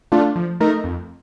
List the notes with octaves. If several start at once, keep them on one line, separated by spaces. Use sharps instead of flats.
A3 D4 F4
F3
A3 D#4 A#4
F2